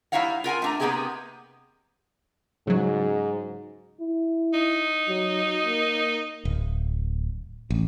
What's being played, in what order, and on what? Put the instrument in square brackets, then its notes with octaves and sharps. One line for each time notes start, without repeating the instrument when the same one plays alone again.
[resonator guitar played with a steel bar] G3 D#4 E4 C#5 F5 F#5
F4 A#4 F#5 G#5
A3 D4 A#5
C3 A#3 B3 G4 G#4 D#5
[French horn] G#2 [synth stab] C#3 F#3
[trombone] E4
[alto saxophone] D#4
[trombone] F#3
A#3
[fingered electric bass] D1
A1